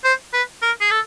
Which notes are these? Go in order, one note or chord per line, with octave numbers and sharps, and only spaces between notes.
C5
B4
A#4
G#4
A4